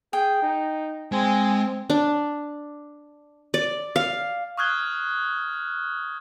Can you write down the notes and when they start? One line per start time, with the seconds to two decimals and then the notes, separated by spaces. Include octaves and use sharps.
0.13 G#4 G5
0.42 D#4
1.12 G#3 C4 G#5
1.90 D4
3.54 D5
3.96 F5
4.58 C#6 D#6 F6 F#6 G#6 G7